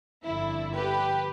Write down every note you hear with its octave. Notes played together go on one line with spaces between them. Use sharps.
G1 F2 D3 E4
G4 B4